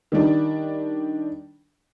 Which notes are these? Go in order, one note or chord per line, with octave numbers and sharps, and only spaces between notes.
D#3 G3 D4